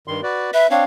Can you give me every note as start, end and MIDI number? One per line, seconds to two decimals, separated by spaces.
0.08 0.21 43
0.08 0.21 51
0.08 0.21 84
0.23 0.51 66
0.23 0.51 71
0.23 0.51 74
0.54 0.67 71
0.54 0.70 76
0.71 0.84 60
0.71 0.84 62
0.71 0.84 73
0.71 0.84 77